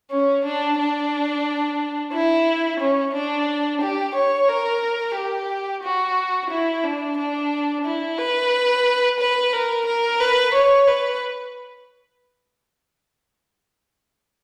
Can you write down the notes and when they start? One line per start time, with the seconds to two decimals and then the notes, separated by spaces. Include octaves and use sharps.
0.11 C#4
0.45 D4
0.78 D4
2.13 E4
2.80 C#4
3.14 D4
3.81 G4
4.15 C#5
4.48 A#4
5.15 G4
5.83 F#4
6.50 E4
6.83 D4
7.17 D4
7.85 E4
8.18 B4
9.19 B4
9.53 A#4
9.86 A#4
10.20 B4
10.54 C#5
10.87 B4